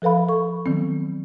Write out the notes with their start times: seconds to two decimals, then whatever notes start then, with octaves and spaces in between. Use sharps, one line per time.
0.02 F3 A4 B4 F5 B5
0.28 A4 C#6
0.66 D#3 F#3 B3 C4